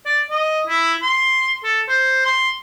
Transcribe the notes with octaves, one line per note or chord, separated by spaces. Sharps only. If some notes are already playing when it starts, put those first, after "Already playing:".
D5
D#5
E4
C6
A4
C5
C6